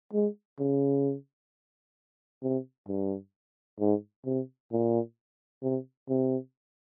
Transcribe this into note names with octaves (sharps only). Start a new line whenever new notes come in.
G#3
C#3
C3
G2
G#2
C3
A#2
C3
C3